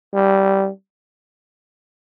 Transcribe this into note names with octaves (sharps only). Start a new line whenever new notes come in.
G3